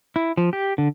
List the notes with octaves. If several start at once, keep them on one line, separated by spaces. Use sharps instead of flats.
E4
F3
G4
D3